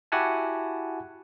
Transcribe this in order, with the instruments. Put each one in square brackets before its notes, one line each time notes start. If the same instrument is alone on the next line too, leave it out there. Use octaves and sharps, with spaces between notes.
[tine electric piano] E4 F#4 G4 F#5 G#5 A5